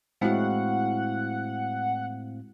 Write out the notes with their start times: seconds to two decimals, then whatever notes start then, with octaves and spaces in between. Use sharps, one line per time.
0.21 A2 G#3 C4 E4 F#4 F5 F#5